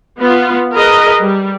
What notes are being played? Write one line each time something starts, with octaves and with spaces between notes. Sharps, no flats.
B3 F4
G#4 A#4 B4 D#5
G3